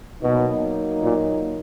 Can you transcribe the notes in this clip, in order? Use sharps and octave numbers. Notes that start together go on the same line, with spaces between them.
B2 F#3 A#3 D#4
A#2